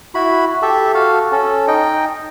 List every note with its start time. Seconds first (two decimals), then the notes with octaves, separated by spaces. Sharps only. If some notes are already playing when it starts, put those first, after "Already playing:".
0.15 E4 F#4 B5
0.62 G4 A4 E5
0.95 F#4 A4 F5
1.32 C#4 A4
1.68 D#4 D#5 G5